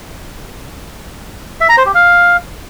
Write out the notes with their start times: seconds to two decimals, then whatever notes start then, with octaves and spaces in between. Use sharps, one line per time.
1.61 E5
1.69 A#5
1.78 C5
1.86 G4
1.94 F5